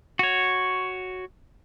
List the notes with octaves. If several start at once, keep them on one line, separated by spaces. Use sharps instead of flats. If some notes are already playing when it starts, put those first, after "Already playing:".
F#4 C#5